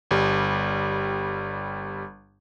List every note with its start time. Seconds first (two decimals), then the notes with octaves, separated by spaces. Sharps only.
0.11 G1 G3